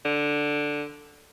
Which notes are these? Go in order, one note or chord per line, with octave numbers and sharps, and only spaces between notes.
D3